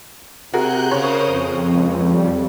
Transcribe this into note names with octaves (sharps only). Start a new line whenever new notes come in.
C3 F#4 G#4 A#4 F#6 G6
C#3 A#4 C5 C#5 D#6
F2
C#2
G3